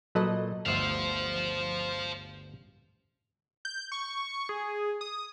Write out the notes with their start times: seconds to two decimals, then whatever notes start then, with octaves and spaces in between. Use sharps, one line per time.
0.15 A#2 F#3 A4 B4 D#5
0.66 G1 D2 C5 E5 F5
3.65 G6
3.92 C#6
4.49 G#4
5.01 D#6